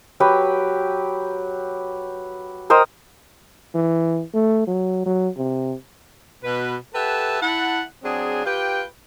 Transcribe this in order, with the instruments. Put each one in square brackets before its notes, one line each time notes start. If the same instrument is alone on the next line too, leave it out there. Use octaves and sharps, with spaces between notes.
[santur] F#3 G4 B4 G5
A#4 C5 D#5 G5
[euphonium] E3
A3
F#3
F#3
C3
[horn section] B2 B4
G4 A4 B4 E5 F#5 A5
E4 F#5 A5
F#3 C4 D4 G#4
F4 G4 B4 G5